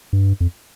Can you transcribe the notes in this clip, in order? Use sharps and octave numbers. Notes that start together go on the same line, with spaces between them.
G2
F2